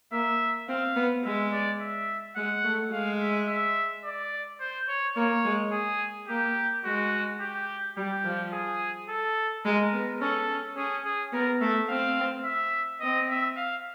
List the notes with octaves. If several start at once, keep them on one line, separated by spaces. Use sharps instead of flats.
A#3 E5
C4 F5
B3
G#3 E5
D5
E5
G#3 F#5
A3
G#3 F5
E5
E5
D5
C5
C#5
A#3 C#5
G#3
G#4
A#3 G4
G#3 F#4
G4
G3 G4
F3
G#4
A4
G#3 A#4
B3
C#4 A4
C#4
C#4 G#4
G#4
B3 A#4
A3 E5
C4 F5
E5
C4 D#5
E5
F5